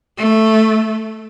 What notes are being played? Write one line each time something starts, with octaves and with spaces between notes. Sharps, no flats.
A3